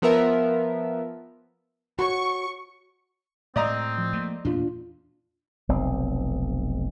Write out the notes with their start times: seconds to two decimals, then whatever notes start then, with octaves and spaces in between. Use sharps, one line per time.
0.02 F3 B3 A#4 E5
1.99 F#4 C#5 C#6
3.56 A2 G#3 C4 D5 D#5 A#5
3.98 F3
4.13 A3 A#3
4.45 E2 A#2 D4 F4
5.69 F1 B1 C4